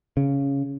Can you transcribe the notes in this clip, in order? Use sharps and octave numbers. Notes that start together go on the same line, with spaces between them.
C#3